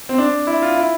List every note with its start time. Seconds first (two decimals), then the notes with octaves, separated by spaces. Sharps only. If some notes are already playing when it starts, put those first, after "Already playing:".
0.09 C4
0.18 D4
0.47 E4
0.62 F4
0.76 E4